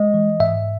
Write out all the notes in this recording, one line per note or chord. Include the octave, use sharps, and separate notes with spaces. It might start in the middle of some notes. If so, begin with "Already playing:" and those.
Already playing: G#3 D#5
E3
G#2 E5